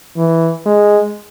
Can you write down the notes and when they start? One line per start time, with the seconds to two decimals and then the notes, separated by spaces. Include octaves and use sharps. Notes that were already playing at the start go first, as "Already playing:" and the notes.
0.17 E3
0.66 G#3